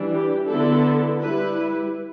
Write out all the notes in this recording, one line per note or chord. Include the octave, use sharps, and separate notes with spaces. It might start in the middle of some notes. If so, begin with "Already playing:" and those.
Already playing: E3 G3 D4
G4
D3 B3 E4 A4
G3 E4 B4